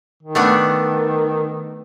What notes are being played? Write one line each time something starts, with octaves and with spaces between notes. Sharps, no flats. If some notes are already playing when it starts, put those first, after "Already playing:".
D#3
A3 B3 D4